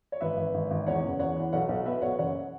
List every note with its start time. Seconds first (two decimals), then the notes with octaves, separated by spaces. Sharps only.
0.12 C#5
0.20 G#1 B4 E5
0.37 G#1
0.54 G#1
0.71 G#1
0.87 E2 C#5 F#5
1.03 F#1
1.19 E2 C#5 F#5
1.36 E3
1.53 B1 C#5 F#5
1.69 B1
1.86 B2 B4 E5
2.02 B1 C#5 F#5
2.19 F#1 C#5 F#5